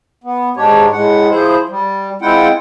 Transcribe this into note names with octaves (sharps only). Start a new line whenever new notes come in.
B3
G#2 G#3 D4 G4 C#5
A2 G#3 F#5
F3 E4 G#4 C5
G3
G#3 C4 E4 F4 F#5 G5